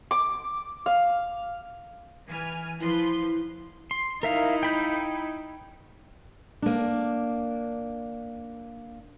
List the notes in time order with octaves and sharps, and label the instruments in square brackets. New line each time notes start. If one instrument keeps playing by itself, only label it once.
[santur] D6
F5
[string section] E3 G#5 F6
[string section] F3 B4 C6 [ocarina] E4
[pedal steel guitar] C6
[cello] D#4 E4 [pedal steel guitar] A#4 E5 F5
[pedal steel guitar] G5 B5 G6
[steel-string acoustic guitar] A#3 D4